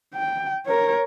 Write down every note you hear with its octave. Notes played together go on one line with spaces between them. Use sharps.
G5
A#4 C#5